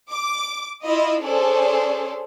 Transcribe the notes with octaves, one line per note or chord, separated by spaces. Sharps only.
D6
E4 F4 D#5
C#4 D4 G#4 A4 C5 D5